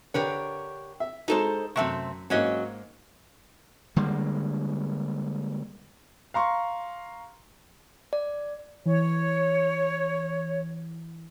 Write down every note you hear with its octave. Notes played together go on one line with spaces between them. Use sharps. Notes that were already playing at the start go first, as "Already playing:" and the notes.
D3 D4 G4 A#4 B4 C#5
E5
G#3 D#4 F#4 A4 C5
F#2 C3 A3 C4 E5 C#6
G#2 F#3 A#3 C#4 D#5
D3 G3 G#3 A#3
F5 A#5 C6 C#6
D5
E3 C#5